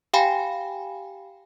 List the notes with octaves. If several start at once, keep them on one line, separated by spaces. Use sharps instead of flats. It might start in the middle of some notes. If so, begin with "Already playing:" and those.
G4 F5 G5 G#5 B5